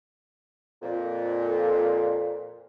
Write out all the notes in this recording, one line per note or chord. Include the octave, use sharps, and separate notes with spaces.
F2 A#2